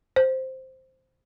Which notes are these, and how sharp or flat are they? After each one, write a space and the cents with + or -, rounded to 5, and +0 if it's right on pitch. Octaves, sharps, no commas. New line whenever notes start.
C5 +0